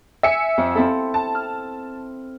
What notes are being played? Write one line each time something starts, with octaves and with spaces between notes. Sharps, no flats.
E5 G#5 C#7
F2
C4 E4 A4
A5
F6